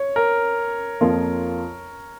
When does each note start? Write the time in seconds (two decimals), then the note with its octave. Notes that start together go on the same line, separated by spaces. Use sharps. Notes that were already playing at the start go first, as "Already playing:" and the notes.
Already playing: C#5
0.16 A#4
1.01 F2 F3 A#3 F4